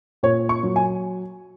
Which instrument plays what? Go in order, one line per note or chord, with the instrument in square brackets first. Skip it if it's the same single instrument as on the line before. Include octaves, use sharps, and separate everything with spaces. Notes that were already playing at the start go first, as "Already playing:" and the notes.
[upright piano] A#2 C#5
C#6
F#3
G#5